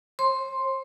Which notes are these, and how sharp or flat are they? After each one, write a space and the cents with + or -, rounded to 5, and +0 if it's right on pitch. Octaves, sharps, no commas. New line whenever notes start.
C5 +40 C6 +5